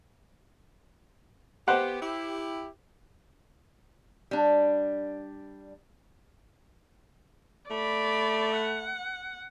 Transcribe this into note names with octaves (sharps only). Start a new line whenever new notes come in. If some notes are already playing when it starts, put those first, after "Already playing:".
B3 G4 C5 F#5
E4 G4
G3 D4
A3 D5 B5
F#5